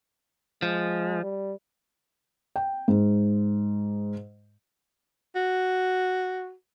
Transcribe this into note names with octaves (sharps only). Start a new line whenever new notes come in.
F3 G#3
G3
G5
G#2
F#4